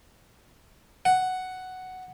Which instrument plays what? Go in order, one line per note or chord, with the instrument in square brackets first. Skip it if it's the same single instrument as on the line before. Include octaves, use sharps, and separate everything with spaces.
[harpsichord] F#5